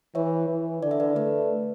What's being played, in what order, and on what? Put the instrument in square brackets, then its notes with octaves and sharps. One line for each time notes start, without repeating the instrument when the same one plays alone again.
[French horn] E3 [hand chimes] C#5 E5
[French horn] E3
[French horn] D3 [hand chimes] D5
[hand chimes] E5
B4 D5
[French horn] A3 [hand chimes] B4 D5